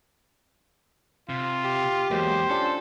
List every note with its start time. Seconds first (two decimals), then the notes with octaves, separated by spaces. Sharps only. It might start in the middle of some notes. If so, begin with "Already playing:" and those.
1.29 C3 F4
1.65 G4
2.11 E2 F#3 G#3 A#3 C5
2.50 C#4 D4 F4 A4